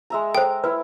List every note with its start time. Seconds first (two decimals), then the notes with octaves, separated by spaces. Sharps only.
0.10 G#3 E5 A#5
0.35 A4 C5 G5
0.64 E4 B4 E5